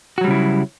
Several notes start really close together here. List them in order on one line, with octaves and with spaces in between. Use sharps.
F#4 F#3 G3 C#3 E4